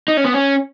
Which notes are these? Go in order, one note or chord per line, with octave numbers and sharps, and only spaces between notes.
D#4
C#4
B3
C#4